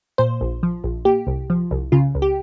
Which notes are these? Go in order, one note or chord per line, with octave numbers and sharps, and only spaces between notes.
A#2 C5
A#1
F3
A#1
A#2 G4
C2
F3
C2
C#3 F4
C#2
G4